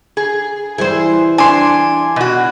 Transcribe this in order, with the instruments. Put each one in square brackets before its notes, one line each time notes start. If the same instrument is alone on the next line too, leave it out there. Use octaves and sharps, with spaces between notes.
[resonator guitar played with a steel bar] G#4
[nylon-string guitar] E3 G3 [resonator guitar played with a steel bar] G#4 C5
[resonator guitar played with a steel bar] D4 [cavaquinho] G#5 C6
[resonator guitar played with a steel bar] B2 F#4